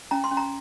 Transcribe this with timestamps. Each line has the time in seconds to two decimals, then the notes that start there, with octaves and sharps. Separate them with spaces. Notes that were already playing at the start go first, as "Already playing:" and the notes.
0.11 C#4 A#5
0.24 C6
0.31 C#4
0.37 A#5